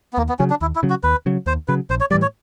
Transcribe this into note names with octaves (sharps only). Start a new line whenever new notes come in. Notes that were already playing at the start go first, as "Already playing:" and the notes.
B3
D#2 A#3
B3
C#3 F#3 C#4
D4
D#2 E4
E4
C#3 F#3
F#4
D#2 B4
C#3 F#3
D#2 C5
C#3 F#3 B4
A#1 C5
C#5
A2 E3 G3 D5
C#5